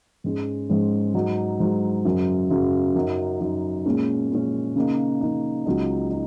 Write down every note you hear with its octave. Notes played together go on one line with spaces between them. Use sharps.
G#2 G#3 C#4
G#2 G#3 C#4
G#2 F#3 D#4
G#2 F#3 D#4
F#2 C#3 F#3
F#2 C#3 F#3
F#2 F#3 D#4
F#2 F#3 D#4
A#2 G#3 C#4
A#2 G#3 C#4
C#3 A#3 D#4
C#3 A#3 D#4
C#2 C#3 F#3 D#4
F#3 D#4